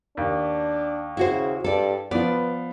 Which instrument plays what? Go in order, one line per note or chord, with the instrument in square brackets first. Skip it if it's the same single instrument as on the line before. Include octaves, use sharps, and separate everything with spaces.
[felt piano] D#2 [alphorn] D4
[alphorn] C#3 [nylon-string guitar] E4 F#4 C5
[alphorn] G2 [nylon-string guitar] A4 D5
[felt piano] F3 B3 [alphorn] B4 [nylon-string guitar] D5